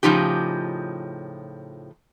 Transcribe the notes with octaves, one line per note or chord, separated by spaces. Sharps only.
A2 C#3 F3 D#4 G4